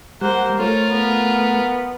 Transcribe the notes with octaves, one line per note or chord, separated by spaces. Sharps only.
G3 A#3 C5 F#5
A3 F4 A#4 C#5
B3